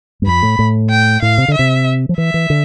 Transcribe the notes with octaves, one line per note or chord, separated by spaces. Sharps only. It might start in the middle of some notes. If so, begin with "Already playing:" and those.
G2
F2 B5
A2
A2
G5
A2 F5
C3
D3
E5
C3
F3
E3 E5
E3
D3